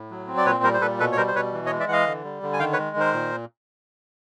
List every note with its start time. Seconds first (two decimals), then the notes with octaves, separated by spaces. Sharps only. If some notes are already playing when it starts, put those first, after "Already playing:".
Already playing: A2
0.11 F#3
0.27 C4
0.37 D5
0.46 A#2 B4 C#5
0.63 G3 A#4 C5
0.74 C5
0.81 A#2 A4 B4
0.99 B2 A4 B4
1.12 C#5
1.17 G3 A#4 C5
1.28 C5
1.35 B2 B4 C#5
1.53 E3
1.66 C#5 D#5
1.71 G#3
1.80 D5 E5
1.88 E3 F#5
1.93 D#5 F5
2.07 D3
2.24 G3
2.43 D3
2.53 G#5
2.59 D#3 F5 G5
2.73 B4 C#5
2.78 G#3
2.96 D#3 A#4 C5
3.13 A#2